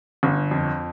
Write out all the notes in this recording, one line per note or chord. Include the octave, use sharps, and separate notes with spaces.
G1
F2